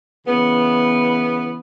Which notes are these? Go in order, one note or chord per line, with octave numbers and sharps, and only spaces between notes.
C#3 E3 B3